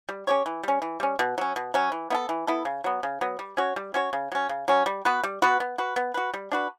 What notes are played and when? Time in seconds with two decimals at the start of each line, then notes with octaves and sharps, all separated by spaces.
0.09 G3
0.27 C#4 G4 C#5
0.46 E3
0.63 G3 C#4
0.82 E3
1.00 G3 C#4
1.19 B2
1.38 F#3 C#4
1.56 B2
1.74 F#3 C#4
1.92 E3
2.10 B3 E4 A4
2.29 E3
2.47 B3 E4 A4
2.65 C#3
2.84 F#3 B3
3.03 C#3
3.21 F#3 B3
3.39 G3
3.57 C#4 F#4 C#5
3.76 G3
3.94 C#4 F#4 C#5
4.13 C#3
4.32 F#3 C#4
4.49 C#3
4.68 F#3 C#4
4.86 G3
5.05 B3 F#4 B4
5.23 G3
5.42 B3 F#4 B4
5.60 B3
5.78 F#4 B4
5.96 B3
6.14 F#4 B4
6.34 G3
6.52 D4 F#4 B4